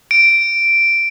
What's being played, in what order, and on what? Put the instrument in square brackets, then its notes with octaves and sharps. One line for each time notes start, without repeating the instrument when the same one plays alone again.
[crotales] D7